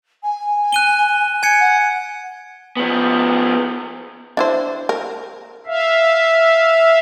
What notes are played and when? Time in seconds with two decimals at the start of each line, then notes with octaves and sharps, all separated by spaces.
0.23 G#5
0.72 F#6 D#7 G7
1.43 G#5 G#6 C#7
1.60 F#5
2.77 F3 B3
4.37 D4 E4 C5
4.89 A#4
5.66 E5 F5